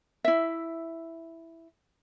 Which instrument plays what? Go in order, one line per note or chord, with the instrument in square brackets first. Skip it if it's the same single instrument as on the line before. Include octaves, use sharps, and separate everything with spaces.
[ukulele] E4 E5